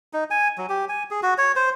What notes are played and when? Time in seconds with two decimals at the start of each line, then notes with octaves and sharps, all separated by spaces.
0.13 D#4
0.30 G#5
0.58 F#3
0.69 G4
0.89 G#5
1.11 G#4
1.23 F#4
1.38 C#5
1.56 C5